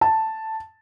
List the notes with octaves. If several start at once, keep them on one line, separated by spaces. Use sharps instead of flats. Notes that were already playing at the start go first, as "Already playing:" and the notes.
A5